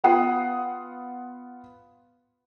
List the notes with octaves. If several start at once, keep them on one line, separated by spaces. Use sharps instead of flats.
B3 F4 F#5 D#6 C7